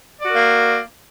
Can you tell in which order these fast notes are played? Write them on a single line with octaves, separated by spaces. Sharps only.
D5 F#4 A#4 A#3